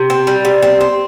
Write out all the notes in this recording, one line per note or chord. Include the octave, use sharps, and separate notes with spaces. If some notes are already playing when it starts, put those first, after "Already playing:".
Already playing: C3
C4
G3
C3
C4
C4